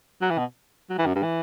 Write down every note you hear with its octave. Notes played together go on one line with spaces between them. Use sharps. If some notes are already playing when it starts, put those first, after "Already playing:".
F#3
E3
B2
F#3
E3
F#2
G2
E3